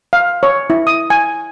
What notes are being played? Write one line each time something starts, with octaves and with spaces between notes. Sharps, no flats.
F5
C#5
E4
D#6
G#5